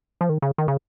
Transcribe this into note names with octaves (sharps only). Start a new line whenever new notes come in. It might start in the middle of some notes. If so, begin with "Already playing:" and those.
F3
D#3
C#3
D#3
C#3